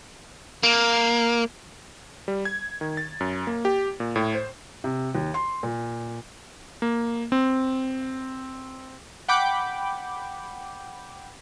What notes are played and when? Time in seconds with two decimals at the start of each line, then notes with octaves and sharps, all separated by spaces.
0.63 A#3
2.28 G3
2.45 G#6
2.81 D#3
2.97 A6
3.21 F#2
3.47 A#3
3.65 G4
4.00 A#2
4.16 A2
4.35 C5
4.84 C3
5.15 D#2
5.34 C6
5.63 A#2
6.82 A#3
7.32 C4
9.28 F#5 G5 B5 D6 G6